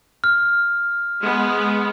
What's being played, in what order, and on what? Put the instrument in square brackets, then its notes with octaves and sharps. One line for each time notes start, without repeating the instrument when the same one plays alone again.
[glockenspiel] F6
[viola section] G#3 B3